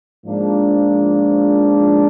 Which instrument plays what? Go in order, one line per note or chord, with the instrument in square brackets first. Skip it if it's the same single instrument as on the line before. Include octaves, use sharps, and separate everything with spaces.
[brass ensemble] G#2 F3 A#3 D4